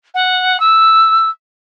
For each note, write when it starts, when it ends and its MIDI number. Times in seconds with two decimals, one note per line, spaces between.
0.14 0.59 78
0.60 1.28 88